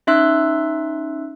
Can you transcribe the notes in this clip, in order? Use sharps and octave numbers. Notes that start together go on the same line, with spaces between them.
C#4 D#4 E5 C6 E6 F#6